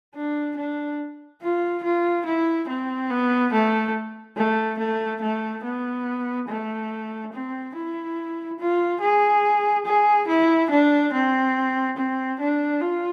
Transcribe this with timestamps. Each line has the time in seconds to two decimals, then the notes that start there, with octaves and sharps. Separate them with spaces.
0.15 D4
0.57 D4
1.42 F4
1.83 F4
2.26 E4
2.69 C4
3.10 B3
3.53 A3
4.37 A3
4.79 A3
5.22 A3
5.63 B3
6.49 A3
7.32 C4
7.75 E4
8.59 F4
9.01 G#4
9.86 G#4
10.28 E4
10.70 D4
11.13 C4
11.97 C4
12.40 D4
12.81 F4